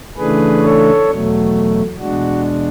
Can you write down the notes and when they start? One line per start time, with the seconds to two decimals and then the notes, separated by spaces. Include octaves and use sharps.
0.17 C#3 E3 A3 D4 G#4 B4
0.62 A4 C#5
1.09 E2 B2 F#3 A3
2.00 E2 B2 G#3 D4 F#4